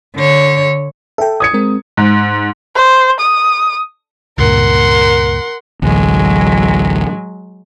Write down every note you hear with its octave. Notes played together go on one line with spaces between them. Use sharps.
D3 C#5
A4 E5 G5
D#6 G#6 C#7
G#3 C4 A#4
G#2
C5
D#6
C#2 G2 A#2 A#4 F#5 C6
A1 D2 F#3 G#3